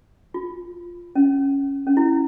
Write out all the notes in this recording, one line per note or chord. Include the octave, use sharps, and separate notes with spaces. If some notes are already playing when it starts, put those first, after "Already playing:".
F4
C#4
C#4
E4